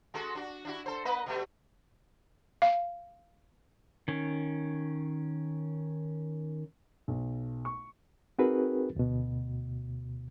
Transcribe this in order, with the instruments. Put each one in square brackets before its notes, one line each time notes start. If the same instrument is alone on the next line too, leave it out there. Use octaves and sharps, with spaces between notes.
[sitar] G#3 F#4 A4
D4 F#4
D4 E4 F#4
A4 C5
A#3 B4 D#5
B2 G3 A3
[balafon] F5
[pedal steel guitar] D#3 C#4
[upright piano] B1
C#6
[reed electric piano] C4 D#4 F#4 G#4 A#4 B4
D2 B2